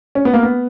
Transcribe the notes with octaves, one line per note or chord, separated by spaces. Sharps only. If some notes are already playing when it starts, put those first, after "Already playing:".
C#4
B3
A#3
B3